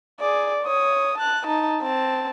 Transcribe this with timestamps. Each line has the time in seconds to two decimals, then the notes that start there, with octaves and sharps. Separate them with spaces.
0.20 G#4 D5
0.64 C#5 D#6
1.18 A5 F#6
1.47 D#4 A5
1.82 C4 A5